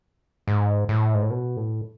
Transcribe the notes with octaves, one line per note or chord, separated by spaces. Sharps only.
G#2
A2
G#2
A2
B2
A2